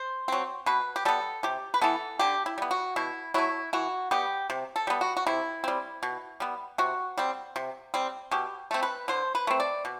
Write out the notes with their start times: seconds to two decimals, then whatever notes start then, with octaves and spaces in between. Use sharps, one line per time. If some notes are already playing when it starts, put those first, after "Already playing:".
Already playing: C5
0.28 F#3 C4
0.66 B2 B4
0.96 G4
1.05 G3 B3 A4
1.43 C3 G4
1.74 B4
1.81 E3 B3 A4
2.19 D3 G4
2.46 E4
2.58 G3 B3
2.71 F#4
2.96 B2 E4
3.34 F#3 A3 E4
3.73 E3 F#4
4.11 G3 B3 G4
4.50 C3
4.76 A4
4.87 G3 B3
5.01 F#4
5.17 F#4
5.27 C3 E4
5.64 G3 C4
6.03 B2
6.40 G3 B3
6.78 C3 F#4
7.18 G3 C4
7.56 C3
7.94 G3 C4
8.31 B2 G4
8.71 A3 C4
8.83 B4
9.08 D3 C5
9.35 B4
9.47 A3 C4
9.60 D5
9.85 B2